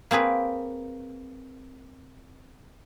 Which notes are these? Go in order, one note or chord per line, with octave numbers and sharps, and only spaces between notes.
A#3 C4 G#4 B4